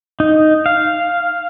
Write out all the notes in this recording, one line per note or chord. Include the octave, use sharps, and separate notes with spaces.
D#4
F5